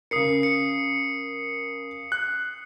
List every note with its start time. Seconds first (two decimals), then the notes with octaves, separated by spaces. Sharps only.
0.11 C#3 A#4 D#6 C7 C#7
0.43 C#7
2.12 F#6